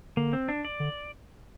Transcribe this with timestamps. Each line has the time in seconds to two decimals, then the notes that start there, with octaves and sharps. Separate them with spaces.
0.17 D3 A#3
0.33 C4
0.48 D4
0.65 D5
0.80 D3